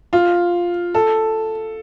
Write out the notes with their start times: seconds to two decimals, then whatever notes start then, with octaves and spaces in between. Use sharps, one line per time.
0.13 F4
0.94 A4